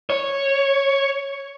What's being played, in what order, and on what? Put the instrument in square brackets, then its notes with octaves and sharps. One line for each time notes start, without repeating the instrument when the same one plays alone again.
[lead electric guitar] C#5